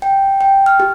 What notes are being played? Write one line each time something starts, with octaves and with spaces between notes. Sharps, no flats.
G5
G5
F6
G4